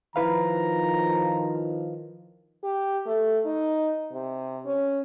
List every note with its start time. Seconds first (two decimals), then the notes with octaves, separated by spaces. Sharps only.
0.16 D#3 F3 E4 B4 F5 A#5
2.64 G4
3.07 A3
3.46 D#4
4.13 C3
4.65 C#4